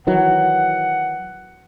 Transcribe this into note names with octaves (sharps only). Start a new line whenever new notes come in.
D#3 E3 F#3 F#5